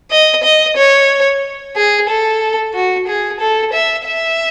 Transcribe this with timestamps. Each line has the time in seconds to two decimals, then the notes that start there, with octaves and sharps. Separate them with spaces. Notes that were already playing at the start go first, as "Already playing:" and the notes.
0.11 D#5
0.44 D#5
0.77 C#5
1.76 G#4
2.09 A4
2.74 F#4
3.08 G#4
3.40 A4
3.73 E5
4.06 E5